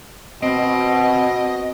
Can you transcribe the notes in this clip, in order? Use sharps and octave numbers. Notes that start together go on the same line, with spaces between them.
B2 C4 D#5